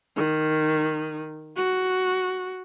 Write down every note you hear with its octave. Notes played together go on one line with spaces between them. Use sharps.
D#3
F#4